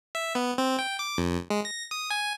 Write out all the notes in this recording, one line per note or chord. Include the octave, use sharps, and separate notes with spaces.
E5
B3
C4
G5
D6
F2
G#3
A#6
D#6
G#5